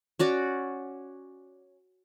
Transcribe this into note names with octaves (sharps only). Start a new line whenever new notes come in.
C#4 F#4 D5